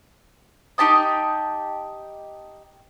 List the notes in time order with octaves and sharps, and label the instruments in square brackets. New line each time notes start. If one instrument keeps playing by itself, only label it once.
[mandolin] D#4 G4 A5 D#6